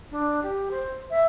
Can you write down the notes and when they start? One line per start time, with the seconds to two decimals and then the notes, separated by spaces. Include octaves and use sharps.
0.11 D4
0.43 G4
0.71 C5
1.10 E5